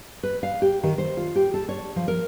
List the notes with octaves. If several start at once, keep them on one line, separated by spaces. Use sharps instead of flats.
B4
F5
G4
D#3
C5
F4
G4
A4
C#5
F3
A#4